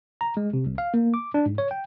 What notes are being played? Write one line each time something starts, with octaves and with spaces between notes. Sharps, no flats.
A#5
G#3
C3
C2
F5
A#3
D6
D4
G#2
C#5
G5